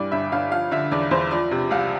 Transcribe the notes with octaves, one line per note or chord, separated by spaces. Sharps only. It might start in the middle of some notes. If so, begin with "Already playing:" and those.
Already playing: G2 E3 D5
G1 E5
G1 F5
F3 F5
D3 E5
E2 D5
E2 C5
F3 D5
C3
C2 F5